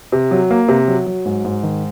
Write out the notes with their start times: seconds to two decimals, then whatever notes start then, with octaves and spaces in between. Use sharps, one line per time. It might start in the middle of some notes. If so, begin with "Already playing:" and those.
0.12 C3
0.31 F#3
0.51 A#3
0.68 C3
0.88 F#3
1.06 F#3
1.26 G#2
1.45 G#2
1.63 D#3